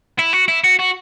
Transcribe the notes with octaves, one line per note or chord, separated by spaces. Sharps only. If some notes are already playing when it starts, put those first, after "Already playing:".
E4
F#4
E4
F#4
F#4